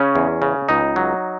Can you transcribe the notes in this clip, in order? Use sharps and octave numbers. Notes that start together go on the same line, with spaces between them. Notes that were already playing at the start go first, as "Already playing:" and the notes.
Already playing: C#3 C#4
E2
C#3
C#2 D#4
F#3